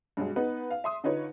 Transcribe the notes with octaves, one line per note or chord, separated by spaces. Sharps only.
G2 B2 F#3 G#3
B3 D#4 B4
F5
E5 C6 D#6
D3 D#4 F4 B4 C#5